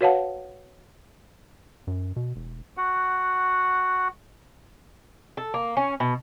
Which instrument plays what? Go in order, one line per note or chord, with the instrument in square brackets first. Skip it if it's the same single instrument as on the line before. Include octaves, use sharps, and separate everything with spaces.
[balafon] F#4 B4 C#5 F5 F#5 A5
[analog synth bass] F#2
B2
E1
[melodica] F#4 F#5
[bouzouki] A4
A#3
C#4
B2